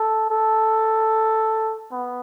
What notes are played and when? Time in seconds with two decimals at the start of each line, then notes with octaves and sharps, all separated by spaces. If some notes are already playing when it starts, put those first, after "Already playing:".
Already playing: A4
0.31 A4
1.92 B3